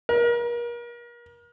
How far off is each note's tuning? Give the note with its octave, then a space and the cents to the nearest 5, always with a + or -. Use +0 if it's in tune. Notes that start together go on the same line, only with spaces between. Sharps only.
A#4 +35